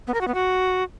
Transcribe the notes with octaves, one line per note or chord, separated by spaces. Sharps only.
B3
A#4
F#4
B3
F#4